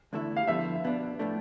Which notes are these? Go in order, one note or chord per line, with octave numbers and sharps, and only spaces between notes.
E2 D3 A3 E4
F5
G2 D3 F3 B3 E4 E5
B2 B3 D4
A2 F3 A3 D4